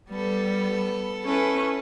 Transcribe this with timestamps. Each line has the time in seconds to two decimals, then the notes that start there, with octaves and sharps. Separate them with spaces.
0.10 G3 B3 A4
1.25 C#4 E4 A4 B4